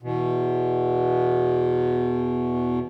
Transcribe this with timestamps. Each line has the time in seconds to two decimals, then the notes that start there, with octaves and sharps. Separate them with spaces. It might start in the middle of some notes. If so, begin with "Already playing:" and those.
0.03 E2 B2